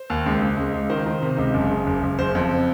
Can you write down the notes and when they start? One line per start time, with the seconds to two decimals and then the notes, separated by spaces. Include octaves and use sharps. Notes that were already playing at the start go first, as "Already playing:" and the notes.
Already playing: C5
0.10 D#2
0.26 C#2
0.42 C#2
0.57 C#2
0.74 C#2
0.90 D#3 C5
1.06 D#3
1.23 C3
1.38 C#2
1.54 F#1
1.71 C#3
1.87 F#1
2.03 F#1
2.19 F#1 C5
2.35 F2